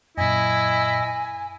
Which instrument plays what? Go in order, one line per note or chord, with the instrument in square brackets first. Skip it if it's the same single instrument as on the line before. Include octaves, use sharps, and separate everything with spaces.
[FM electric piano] F#2 A#2 [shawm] E4 [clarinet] D#5 [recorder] G#5